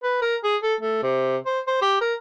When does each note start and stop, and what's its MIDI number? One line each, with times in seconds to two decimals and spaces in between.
0.03 0.22 71
0.22 0.36 70
0.44 0.56 68
0.63 0.75 69
0.81 1.02 57
1.03 1.37 48
1.46 1.60 72
1.67 1.81 72
1.82 1.96 67
2.01 2.14 70